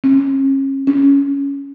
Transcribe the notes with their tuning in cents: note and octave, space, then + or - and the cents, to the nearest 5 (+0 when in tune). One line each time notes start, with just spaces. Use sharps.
C#4 -35
C#4 +10